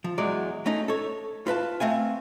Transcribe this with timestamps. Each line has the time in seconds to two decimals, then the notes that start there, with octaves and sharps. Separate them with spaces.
0.04 F3
0.18 E2 F#3 G#3 D5
0.66 A3 C#4 D#4
0.88 A4 C#5
1.47 F4 B4 F5 A5
1.80 A3 C4 F5 G#5